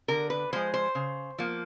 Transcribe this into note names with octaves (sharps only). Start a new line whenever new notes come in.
D3 A#4
B4
F3 G#3 C5
C5
C#3
F3 A#3